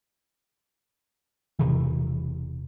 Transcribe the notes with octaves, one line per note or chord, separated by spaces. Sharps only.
E1 B1 C3 E3